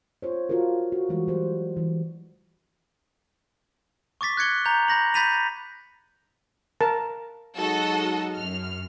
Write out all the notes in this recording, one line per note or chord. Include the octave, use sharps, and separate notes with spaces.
F4 C5 C#5
F4 F#4 A4 A#4
F#4
E3 G3 G#3 F#4
F#3 G3 C5
E3 G3
C#6 D6 A6 B6
F#6 G#6 C#7 G7
A#5 G6 F7
B5 G6 A#6 F#7
B5 G6 A6 B6 D#7 F7
A#4 A5
F#3 G#3 D#4 F#4 A4 D#5
F#2 F6